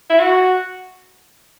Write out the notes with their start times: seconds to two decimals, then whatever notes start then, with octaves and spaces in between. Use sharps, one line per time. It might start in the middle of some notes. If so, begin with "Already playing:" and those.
0.09 E4
0.20 F#4